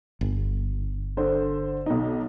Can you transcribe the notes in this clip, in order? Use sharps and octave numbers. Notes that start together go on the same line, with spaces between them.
G1
D3 C5
B1 D#4